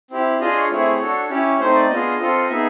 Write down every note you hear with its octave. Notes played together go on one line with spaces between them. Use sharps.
C4 E4 G4
D4 F4 G#4 D#5
C#5
A3 C4 E4 G#4 C#5
D4 F#4 A4
C#4 E4 G4 C#5
A3 C4 D#4 C5
D5
B3 D4 F4 G#4 D#5
C4 F4 A4
B3 D#4 G#4 E5